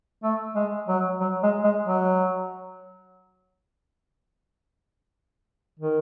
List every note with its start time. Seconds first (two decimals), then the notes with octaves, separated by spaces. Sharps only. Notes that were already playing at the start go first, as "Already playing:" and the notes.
0.24 A3
0.56 G#3
0.89 F#3
1.21 F#3
1.43 G#3
1.64 G#3
1.86 F#3
5.79 D#3